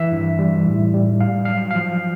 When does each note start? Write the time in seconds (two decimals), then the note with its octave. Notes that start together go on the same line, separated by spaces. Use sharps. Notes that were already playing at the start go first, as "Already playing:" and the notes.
Already playing: E3 E5
0.12 G2
0.39 G3
0.66 A2
0.94 G3
1.21 G#2 F5
1.45 F#3 F5
1.71 F3 F5